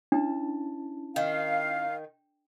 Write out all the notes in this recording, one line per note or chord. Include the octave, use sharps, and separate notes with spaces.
C#4 D4 E4 A5
D#3 F5